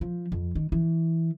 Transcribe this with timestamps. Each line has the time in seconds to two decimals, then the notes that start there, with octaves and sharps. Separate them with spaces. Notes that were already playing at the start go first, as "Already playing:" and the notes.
0.01 F3
0.32 F2
0.55 D#3
0.72 E3